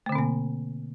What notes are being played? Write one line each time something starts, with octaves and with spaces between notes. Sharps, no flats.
B2 D3 A3 A#3 C4